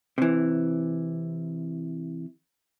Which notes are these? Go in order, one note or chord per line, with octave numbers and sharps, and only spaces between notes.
C3 E3